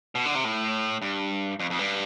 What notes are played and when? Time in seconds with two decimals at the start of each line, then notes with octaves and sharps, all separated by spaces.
0.15 B2
0.26 D3
0.35 C3
0.44 A2
1.02 G2
1.59 F2
1.70 F2
1.79 G2